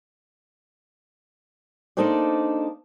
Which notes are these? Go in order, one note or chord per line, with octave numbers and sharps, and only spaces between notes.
A#3 D4 D#4 A4 C5 D5